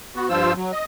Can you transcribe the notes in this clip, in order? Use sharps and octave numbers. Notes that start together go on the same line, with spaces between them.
B3 F#4
G2 F3 F4 C5 E6
F#3
D#5